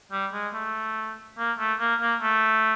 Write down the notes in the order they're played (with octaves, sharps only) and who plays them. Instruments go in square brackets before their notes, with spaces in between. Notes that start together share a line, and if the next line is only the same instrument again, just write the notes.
[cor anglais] G3
G#3
A3
A#3
A3
A#3
A#3
A3